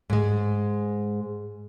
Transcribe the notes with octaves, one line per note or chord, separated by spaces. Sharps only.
G#2 G#3